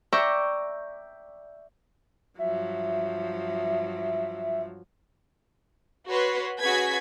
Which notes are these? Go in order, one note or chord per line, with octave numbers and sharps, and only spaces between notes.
D5 E5 G5 A#5 C#6 E6
G2 F3 F#3 E5
F#4 B4 C#5 C6
C#4 F#4 G#4 B4 G#6 B6